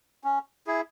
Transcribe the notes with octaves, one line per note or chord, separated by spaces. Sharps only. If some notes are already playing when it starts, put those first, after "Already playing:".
C#4
E4 G#4